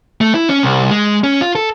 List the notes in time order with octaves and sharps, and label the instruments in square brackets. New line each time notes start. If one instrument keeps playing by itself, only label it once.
[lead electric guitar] A3
E4
C#4
C2
G#3
C#4
F4
A4